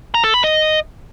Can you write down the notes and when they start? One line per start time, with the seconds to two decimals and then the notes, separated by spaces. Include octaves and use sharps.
0.14 A#5
0.24 A4
0.34 B5
0.44 D#5